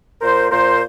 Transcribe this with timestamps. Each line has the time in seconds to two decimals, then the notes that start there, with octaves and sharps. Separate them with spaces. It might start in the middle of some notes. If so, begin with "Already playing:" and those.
0.21 A#2 A#4 C5
0.51 A#2 A#4 C5